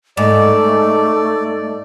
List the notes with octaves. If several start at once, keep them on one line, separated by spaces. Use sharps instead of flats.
G#2 A3 D5